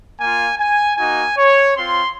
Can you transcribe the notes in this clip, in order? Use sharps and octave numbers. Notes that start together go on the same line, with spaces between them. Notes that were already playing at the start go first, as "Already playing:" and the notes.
A#3 F4 G#5
G#5
A#3 D#4 F#4 G#5
C#5
C4 F4 C6